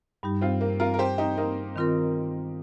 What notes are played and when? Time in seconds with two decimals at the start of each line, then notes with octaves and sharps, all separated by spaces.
0.23 G2 G3 D#4 G4
0.41 C4 F4
0.61 A#3
0.80 F4 A#4
0.94 A#4
0.99 G4 C5
1.18 D#4 G4
1.38 A#3 D#4
1.76 D#3 C4 F4 A#4